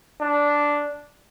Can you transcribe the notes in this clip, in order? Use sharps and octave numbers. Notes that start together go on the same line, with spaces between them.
D4